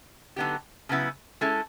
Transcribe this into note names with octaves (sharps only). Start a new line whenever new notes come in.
D3 F#3 B3 D#4 G4
C#3 F#3 B3 E4
G#3 C#4 E4 A4